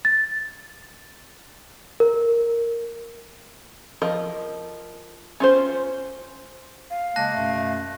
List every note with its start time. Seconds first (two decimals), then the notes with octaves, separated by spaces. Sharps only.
0.05 A6
2.00 A#4
4.02 F3 A#4 D#5
5.40 C#4 F4 C5
6.90 F5
7.16 C#3 G#3 A#3 A5 F#6 A#6
7.34 F#2 B2 A3